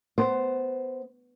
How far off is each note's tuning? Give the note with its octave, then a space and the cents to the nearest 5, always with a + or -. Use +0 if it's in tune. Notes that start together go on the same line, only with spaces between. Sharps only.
B3 +15 C5 +0